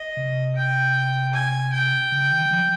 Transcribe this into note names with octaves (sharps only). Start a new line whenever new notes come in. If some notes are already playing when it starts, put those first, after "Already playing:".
Already playing: D#5
C3
G5
G#5
G5
C#3
D#3
D#3
F3